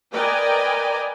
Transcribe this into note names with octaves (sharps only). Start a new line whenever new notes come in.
A#4 B4 D5 D#5 G5 G#5